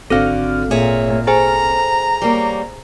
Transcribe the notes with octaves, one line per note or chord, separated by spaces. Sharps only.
G#1 D3 C4 F#4 A4 F5 F6
A#2 G#4 C#5 E5
G#4 A4 C5 G#5 A#5
G3 A#3 C#5